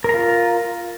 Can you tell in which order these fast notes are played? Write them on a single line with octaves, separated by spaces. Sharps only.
A#4 A#5 F4